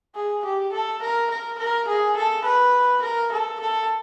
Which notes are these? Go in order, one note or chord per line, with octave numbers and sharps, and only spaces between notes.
G#4
G4
A4
A#4
A#4
A#4
G#4
A4
B4
A#4
A4
A4